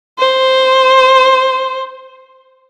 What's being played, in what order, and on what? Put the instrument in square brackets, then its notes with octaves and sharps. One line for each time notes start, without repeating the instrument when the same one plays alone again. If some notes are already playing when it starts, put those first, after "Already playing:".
[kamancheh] C5